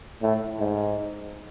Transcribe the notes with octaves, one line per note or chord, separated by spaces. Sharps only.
A2
G#2